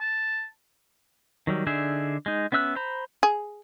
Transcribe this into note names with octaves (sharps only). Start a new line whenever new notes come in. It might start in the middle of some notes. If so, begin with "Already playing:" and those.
A5
D#3 F#3 G3
D3 D4 D#4 G#4 E5
G#3 D#4
B3 C#4 E5 E6 F#6
C5 A#5 B5
G#4